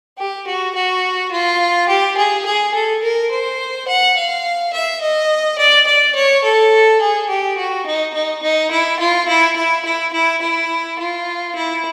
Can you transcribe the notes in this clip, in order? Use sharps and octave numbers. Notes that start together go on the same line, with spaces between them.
G4
F#4
F#4
F4
G4
G#4
G#4
A4
A#4
C5
F#5
F5
E5
D#5
D5
D5
C#5
A4
G#4
G4
F#4
D#4
D#4
D#4
E4
F4
E4
E4
E4
E4
E4
F4
E4